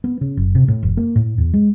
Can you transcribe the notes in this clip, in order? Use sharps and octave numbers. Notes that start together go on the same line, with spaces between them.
B3
C#3
F#1
C3
A2
F1
A#3
A2
E2
G#3